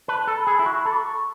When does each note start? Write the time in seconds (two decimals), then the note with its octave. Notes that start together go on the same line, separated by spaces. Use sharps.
0.08 B4 A5
0.27 A4
0.37 B5
0.47 G#4
0.59 E4
0.66 F#4 C#6
0.78 B5
0.86 A4
0.91 D6
0.96 C#6